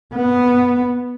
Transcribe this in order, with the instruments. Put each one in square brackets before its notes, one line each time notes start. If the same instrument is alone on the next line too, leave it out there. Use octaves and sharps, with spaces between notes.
[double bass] B3